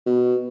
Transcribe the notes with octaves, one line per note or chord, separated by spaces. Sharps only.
B2